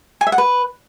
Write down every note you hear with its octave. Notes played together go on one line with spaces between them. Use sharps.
G#5
E5
F#5
B4